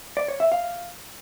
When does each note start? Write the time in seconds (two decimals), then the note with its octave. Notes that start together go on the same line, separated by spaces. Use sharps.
0.17 D5
0.28 C#5
0.40 E5
0.52 F5